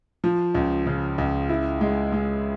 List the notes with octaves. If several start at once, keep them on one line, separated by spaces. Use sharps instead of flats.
F3
C#2
C#3
C#2
E4
G#3
G#3